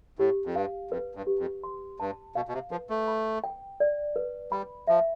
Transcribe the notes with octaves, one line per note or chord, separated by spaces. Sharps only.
A2 G4
F2
G2 F5
F2 B4
G2
G4
F2
C6
G2 A5
B2 F5
B2
C3
F3 B4
A3
B5
G5
D5
B4
G3 B5
F3 E5